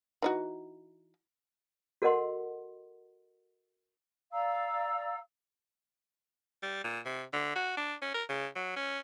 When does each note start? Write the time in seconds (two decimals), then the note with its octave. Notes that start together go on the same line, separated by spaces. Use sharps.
0.22 E3 D#4 F#4
2.02 F#4 A4 A#4 D#5 F#5 C6
4.32 D5 F5 A#5 E6
6.62 G3
6.84 A#2
7.05 C3
7.33 D3
7.55 F#4
7.77 D4
8.02 C#4
8.14 A#4
8.29 C#3
8.56 F#3
8.76 C#4